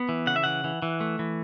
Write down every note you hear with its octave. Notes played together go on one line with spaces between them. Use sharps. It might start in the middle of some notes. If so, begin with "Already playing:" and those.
Already playing: B3
E3
C#3 F#5
E5
E3 F#5
E3
E3
A3
E3